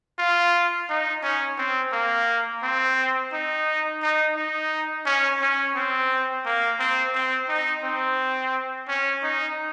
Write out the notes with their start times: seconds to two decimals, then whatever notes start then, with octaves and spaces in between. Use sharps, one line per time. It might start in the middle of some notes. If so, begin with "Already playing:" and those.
0.19 F4
0.89 D#4
1.23 C#4
1.58 C4
1.93 A#3
2.63 C4
3.33 D#4
4.02 D#4
4.37 D#4
5.06 C#4
5.42 C#4
5.75 C4
6.46 A#3
6.79 C4
7.15 C4
7.49 D#4
7.84 C4
8.88 C#4
9.23 D#4